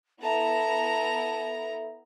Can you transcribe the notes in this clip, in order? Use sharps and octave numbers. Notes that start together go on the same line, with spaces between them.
B3 E4 A4 E5 A5 A#5